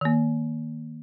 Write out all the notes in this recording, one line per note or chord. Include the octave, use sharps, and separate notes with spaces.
D#3 A#3